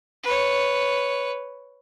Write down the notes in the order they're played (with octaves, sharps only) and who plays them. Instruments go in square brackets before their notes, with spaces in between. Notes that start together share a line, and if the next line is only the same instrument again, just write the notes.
[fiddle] B4 C#5